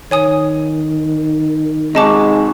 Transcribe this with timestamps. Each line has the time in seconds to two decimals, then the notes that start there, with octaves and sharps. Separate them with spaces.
0.11 D#3 C#5 G#5 D#6
1.95 C3 G#3 D#4 F#4 D#5 A5 D6